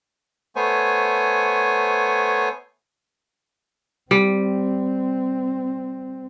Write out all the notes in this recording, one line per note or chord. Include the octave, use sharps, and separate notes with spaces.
A3 B3 C5 C#5 G#5
G3 C4